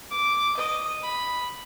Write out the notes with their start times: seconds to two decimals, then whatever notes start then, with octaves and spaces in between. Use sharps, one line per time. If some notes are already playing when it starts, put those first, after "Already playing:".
0.11 D6
0.57 D#5
1.02 B5